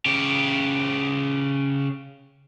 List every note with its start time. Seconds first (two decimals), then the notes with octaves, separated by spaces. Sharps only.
0.06 C#3 G4